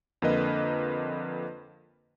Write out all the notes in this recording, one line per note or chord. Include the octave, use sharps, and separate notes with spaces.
F2 D3 A#3 A#4 B4 D#5